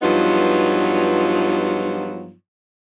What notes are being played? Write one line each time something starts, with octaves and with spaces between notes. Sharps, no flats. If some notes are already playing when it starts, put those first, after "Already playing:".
G2 F3 F#3 B3 D#4 F4